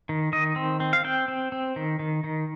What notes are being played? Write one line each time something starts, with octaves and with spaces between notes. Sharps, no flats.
D#3
D#3 D#5
C4
C4
F5
C4 G5
C4
C4
D#3
D#3
D#3